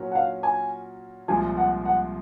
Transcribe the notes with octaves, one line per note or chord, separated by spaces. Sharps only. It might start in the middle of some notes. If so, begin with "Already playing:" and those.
Already playing: A#2 F#3 C#4 F#4 A#4
F#5
F5
G#5
C2 A#2 F3 G#3 G#5
F#5
F#5